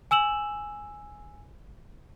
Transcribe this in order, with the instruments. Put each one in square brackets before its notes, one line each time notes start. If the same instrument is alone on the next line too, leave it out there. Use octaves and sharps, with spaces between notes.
[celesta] G#5 E6 E7 F#7